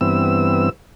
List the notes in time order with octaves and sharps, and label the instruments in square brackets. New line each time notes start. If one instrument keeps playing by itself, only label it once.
[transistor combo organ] G2 E3 B3 C4 E6